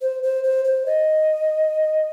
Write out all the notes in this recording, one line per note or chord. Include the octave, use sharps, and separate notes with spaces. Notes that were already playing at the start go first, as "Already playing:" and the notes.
C5
C5
C5
C5
D#5